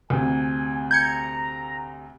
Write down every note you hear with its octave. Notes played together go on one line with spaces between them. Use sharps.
D2 C3 G#5
A#5 G6 G#6 C#7